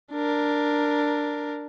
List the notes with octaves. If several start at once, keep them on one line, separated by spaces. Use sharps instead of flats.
D4 A#4